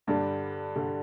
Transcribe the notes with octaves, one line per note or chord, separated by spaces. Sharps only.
G2 D3 G3 D4
G2 D3 G3